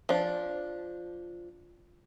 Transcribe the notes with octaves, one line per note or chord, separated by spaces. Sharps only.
F3 D4